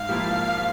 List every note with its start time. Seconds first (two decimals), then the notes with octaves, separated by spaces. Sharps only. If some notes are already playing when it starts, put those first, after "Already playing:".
Already playing: G#2 F5
0.09 F3 A#3 E4 G4